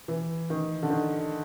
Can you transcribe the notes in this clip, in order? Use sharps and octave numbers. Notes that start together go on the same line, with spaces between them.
E3
D#3
D3
D#3